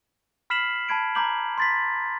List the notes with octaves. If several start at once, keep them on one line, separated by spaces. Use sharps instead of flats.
B5 F6 B6 C7 E7 F#7
A5 B5 G#6 D7
A#5 B5 D6 G6 F#7
C6 A6 B6